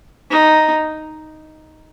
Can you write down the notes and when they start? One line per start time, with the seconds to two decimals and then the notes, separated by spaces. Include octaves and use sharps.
0.30 D#4